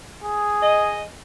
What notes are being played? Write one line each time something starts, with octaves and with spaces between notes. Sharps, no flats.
G#4
D#5